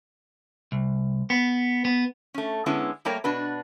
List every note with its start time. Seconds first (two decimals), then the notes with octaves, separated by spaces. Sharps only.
0.72 C2
1.30 B3
1.85 B3
2.34 A3 C#4
2.66 D3 G#3 B3 C#4 E4
3.05 G3 A3 A#3 A#4 C#5 G5
3.24 B2 D4 F#4 B4